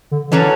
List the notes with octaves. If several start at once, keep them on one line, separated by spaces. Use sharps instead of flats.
D3
D3 E3 F#3 C#4 F#4 A4